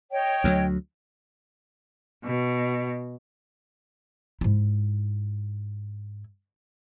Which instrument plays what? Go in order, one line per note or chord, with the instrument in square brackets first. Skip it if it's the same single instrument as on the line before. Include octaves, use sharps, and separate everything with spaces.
[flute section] C#5 D#5 G5
[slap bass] D2 F3 F#3
[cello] B2
[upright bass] G#2 E4